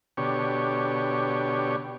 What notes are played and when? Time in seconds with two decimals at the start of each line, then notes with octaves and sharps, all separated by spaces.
0.17 B2 D3 G4 C#5